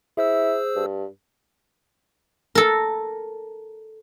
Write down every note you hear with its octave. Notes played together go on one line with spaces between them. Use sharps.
E4 G#4 C5 E6
G2
A4 A#4